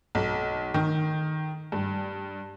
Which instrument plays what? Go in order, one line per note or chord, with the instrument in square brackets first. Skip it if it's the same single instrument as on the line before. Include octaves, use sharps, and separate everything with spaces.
[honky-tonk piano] B1
D#3
G2